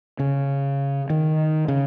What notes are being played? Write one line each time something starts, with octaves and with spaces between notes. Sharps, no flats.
C#3
D#3
C#3